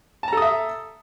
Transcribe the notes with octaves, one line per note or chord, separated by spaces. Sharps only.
A4 E5 A5 A#5 D#6